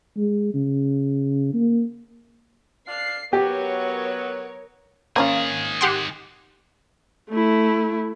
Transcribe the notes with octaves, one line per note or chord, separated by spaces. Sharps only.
G#3
C#3
A#3
D4 F5 C7
F#3 B3 G4 A#4 C#5
D#3 A#3 C#4 F4 G#4
G4 F#5 C6
A3 E4